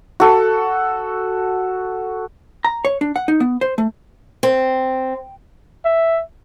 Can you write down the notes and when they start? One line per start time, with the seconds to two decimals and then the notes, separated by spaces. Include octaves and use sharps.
0.20 F#4 A4
2.65 A#5
2.85 C#5
3.01 D4
3.16 F#5
3.28 D#4
3.40 B3
3.61 C5
3.78 A3
4.43 C4
5.85 E5